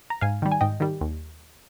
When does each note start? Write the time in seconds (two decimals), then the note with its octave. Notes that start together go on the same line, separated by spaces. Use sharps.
0.10 A#5
0.21 G#2 F5 G#5
0.42 D#3 G3
0.52 G#5
0.61 G#2 D#5 G5
0.80 D#3 G3
1.01 D#2